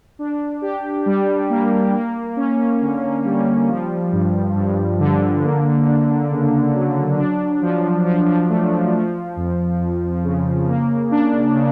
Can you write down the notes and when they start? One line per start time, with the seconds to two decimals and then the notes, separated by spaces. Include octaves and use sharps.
0.19 D4
0.62 G4
1.06 G3
1.50 A#3
1.94 A#3
2.36 C#4
2.81 D3
3.25 G3
3.68 F3
4.12 G2
4.55 G2
5.00 D3
5.43 A#3
5.87 D4
6.31 C#3
6.74 F#3
7.18 D4
7.61 F3
8.05 F3
8.49 A3
8.93 F3
9.36 F2
9.80 F2
10.24 C#3
10.67 A#3
11.11 D4
11.55 C#3